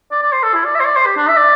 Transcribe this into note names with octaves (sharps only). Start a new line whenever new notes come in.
D5
D5
C5
A4
E4
D5
E5
C5
D5
C5
G4
D4
E5
D5